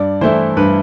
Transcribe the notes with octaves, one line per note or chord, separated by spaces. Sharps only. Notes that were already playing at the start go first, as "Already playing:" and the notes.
Already playing: G2 D5
E3 A3 E4 C5
G2 B4